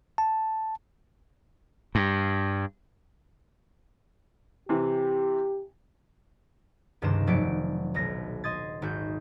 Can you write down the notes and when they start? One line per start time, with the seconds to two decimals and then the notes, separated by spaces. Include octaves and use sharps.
0.18 A5
1.95 G2
4.69 C3 E3 G4
7.02 C#2 G2 C3 D#3 C5 E7
7.27 F1 F#3 A3 D5 C#7 D7
7.94 D#1 B1 A#6
8.44 D#5 C6 D#6 G#6 A6
8.82 G#1 F#4 G6